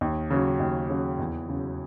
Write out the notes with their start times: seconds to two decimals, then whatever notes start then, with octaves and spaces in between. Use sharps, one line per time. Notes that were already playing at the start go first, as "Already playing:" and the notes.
0.01 D#2
0.30 C#3 F#3
0.60 D#2
0.90 C#3 F#3
1.19 E2
1.49 C#3 F#3